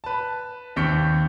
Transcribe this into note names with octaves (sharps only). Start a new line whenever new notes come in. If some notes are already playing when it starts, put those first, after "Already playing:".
B4 A5
D#2 C4 C#6 G6 B6 C#7